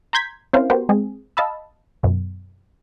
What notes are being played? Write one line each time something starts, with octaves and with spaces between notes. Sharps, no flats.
A#5 C6 G6 G#6 B6
C4 C#4 E4 A#4 C5 F5
B3 F#4 G4 A#4 C5
G#3 C4 G#4
D#5 F5 A5 B5 E6
F#2 B2